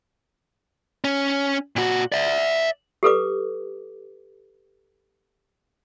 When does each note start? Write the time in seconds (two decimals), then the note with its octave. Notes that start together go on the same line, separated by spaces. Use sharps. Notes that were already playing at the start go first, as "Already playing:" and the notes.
1.04 C#4
1.76 A#2 F#4
2.12 D5 E5
3.03 G4 A4 B4 D6